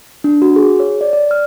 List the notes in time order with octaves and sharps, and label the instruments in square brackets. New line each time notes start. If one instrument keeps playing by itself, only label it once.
[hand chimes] D4
F#4
G#4
C#5
D5
D5
F6